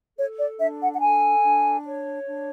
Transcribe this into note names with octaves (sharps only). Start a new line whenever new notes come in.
A4 C#5
D5
D4 E5
F#5
F#5
A4 G#5
D4
C#5
D4